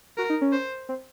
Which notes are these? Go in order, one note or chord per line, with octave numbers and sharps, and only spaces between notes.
F#4 A#4
D#4
C#4
C5
C4